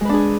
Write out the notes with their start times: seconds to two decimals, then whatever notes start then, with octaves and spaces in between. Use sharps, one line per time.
0.01 G#3
0.05 B4
0.09 D4
0.14 G#4